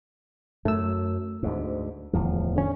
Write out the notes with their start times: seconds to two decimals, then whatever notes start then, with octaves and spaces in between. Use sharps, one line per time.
0.65 F#2 A3 E6
1.43 D2 G#2
2.13 D1 E2 F3
2.56 D3 C#4